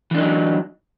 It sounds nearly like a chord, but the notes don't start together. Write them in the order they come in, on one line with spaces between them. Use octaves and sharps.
E3 D4 D#4 F#3